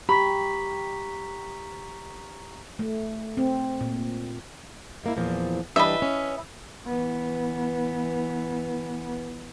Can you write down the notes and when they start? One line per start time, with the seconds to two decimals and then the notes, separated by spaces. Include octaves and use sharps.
0.09 G4 A#5 B5 C#6 B6
2.79 A3
3.37 C4
3.81 A#2
5.04 G#2 A#3 E4
5.17 E2 A#2 F3
5.76 E3 G3 D4 B4 D#5 E5
6.02 C#4
6.87 E3 B3